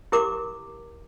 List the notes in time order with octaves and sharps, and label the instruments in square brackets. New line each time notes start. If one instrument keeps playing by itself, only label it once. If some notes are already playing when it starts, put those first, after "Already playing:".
[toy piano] E4 G4 A#4 D6